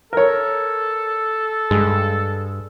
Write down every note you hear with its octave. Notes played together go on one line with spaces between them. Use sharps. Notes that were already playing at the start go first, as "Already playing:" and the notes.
A4 A#4 C#5
G2 G#3